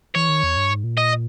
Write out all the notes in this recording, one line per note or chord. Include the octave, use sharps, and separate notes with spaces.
E3 C#5
D#3
E2
G2
G#2
A#2
D#5